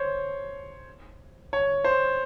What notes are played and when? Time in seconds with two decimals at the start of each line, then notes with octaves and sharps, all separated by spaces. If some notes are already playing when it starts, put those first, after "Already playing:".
Already playing: C5 C#5
1.53 C#5
1.85 C5